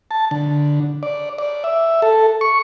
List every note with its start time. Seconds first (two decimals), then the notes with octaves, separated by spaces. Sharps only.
0.11 A5
0.31 D3
1.03 D5
1.38 D5
1.64 E5
2.02 A4
2.41 C#6